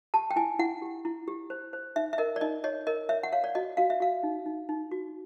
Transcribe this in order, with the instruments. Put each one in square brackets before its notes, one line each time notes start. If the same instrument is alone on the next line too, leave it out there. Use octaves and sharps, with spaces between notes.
[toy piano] G4 A5
G5
E4 G#5
E4 F#5
G4
E4
G4
C5
C5
D#4 E5
E5
A#4 D#5
D5
D#4 D#5
C#5 D#5
A#4 D#5
C#5 E5
F#5
C#5 F5
D5
F#4 D#5
F#4 F5
E5
F#4 F5
D#4
D#4
D#4
F#4